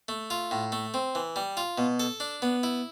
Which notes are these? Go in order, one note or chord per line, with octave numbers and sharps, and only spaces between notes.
A3
F4
A2
A3
C4
E3
G3
F4
B2
A4
D4
B3
E4